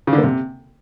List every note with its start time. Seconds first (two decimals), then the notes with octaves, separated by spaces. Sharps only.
0.07 C#3
0.13 D3
0.18 A#3
0.23 C3